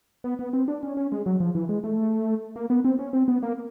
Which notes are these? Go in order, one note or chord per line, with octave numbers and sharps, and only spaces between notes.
B3
B3
C4
D4
C#4
C#4
G#3
F#3
F3
E3
G#3
A3
A#3
B3
C4
C#4
C4
B3
A#3